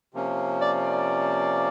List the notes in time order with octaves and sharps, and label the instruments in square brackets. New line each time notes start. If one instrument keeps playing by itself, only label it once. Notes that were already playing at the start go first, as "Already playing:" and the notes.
[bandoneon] C3 F3 A#3 C#4
[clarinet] D5
D5